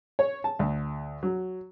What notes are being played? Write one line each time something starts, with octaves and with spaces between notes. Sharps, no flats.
C#5
A5
D2
F#3